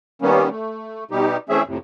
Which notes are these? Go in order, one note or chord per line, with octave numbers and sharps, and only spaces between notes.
D#3 G3 A#3 B3 C#4
A3
B2 G3 D#4 G4
E3 A3 C4 C#4 G#4 E5
F2 A2 C3